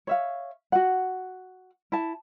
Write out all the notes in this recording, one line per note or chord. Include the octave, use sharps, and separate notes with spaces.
C#5 E5 F5
F#4 F#5
E4 A5